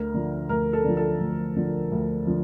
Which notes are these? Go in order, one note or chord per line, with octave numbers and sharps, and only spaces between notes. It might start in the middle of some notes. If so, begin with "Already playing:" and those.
Already playing: D2 A#4
D3 F3
D2 A#4
A4
D3 F3
A4
D2
D3 F3
D2
D3 F3